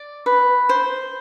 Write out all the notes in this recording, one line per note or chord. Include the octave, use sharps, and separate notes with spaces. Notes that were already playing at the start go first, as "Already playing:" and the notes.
Already playing: D5
B4
C5